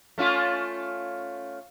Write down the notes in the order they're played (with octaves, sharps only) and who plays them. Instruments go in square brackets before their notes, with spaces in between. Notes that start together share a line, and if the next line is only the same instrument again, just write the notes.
[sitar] A3 C#4 F4